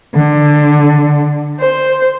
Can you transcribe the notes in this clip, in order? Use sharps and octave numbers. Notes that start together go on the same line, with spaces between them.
D3
C5